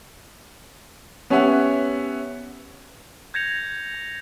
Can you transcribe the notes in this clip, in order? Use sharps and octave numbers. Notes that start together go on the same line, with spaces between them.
B3 C#4 G4 C#5 E5 F#5
G6 G#6 A#6 C#7 F7